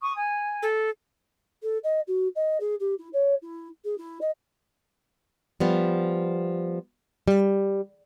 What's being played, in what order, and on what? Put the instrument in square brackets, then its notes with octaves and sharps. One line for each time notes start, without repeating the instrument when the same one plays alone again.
[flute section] C#6 D#6
G#5
[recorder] A4
[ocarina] A4
D#5
F#4
D#5
G#4
G4
E4
C#5
E4
G#4
E4
D#5
[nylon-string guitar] F3 G3 B3
G3